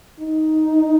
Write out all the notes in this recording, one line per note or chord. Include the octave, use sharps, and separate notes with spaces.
D#4